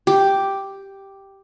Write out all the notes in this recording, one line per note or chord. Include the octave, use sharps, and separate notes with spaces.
G4